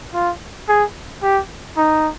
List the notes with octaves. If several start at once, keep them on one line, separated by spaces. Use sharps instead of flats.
F4
G#4
G4
D#4